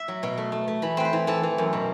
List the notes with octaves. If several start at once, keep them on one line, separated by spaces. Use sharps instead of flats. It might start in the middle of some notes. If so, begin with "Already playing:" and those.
Already playing: E5
F#3
B2
A3
A3
A3
E3 B5
C4 B4
C5
E3
E3 A4
E3
F#2
B2